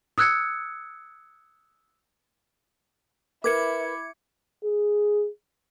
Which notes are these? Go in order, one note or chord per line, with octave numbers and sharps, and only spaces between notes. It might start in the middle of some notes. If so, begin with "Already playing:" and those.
D#6 E6 F#6 G#6 C#7
E4 A#4 B4 D6 G#6 C#7
G#4